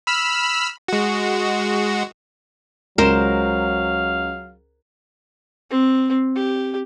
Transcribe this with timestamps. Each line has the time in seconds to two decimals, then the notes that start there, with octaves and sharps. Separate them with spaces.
0.07 B5 E6 F6
0.88 G#3 F#4
2.98 C#2 F#3 A#4 C5 F5 E7
5.70 C4
6.36 G4